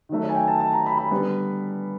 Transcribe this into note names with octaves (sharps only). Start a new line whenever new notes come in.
D#3 F#3 A3
C#5
G#5
G5
A5
A5
A#5
B5
B5
D3 G3 B3